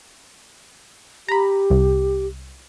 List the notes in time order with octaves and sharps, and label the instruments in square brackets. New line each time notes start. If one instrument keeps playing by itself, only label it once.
[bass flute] G4 [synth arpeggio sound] A#5 B5
[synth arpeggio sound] C2